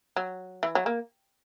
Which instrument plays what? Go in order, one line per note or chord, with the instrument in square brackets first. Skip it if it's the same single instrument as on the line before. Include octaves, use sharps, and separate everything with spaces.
[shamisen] F#3
E3
F#3
A#3